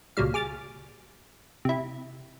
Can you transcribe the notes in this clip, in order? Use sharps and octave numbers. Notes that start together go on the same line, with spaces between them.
C#2 A#2 F#3 G3 F5
G#4 D6 F6 A6
C3 E4